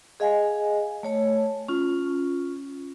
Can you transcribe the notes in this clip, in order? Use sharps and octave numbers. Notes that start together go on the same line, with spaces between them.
G#4 D#5 F5 G#5
A3 C#5 A5
C#4 F4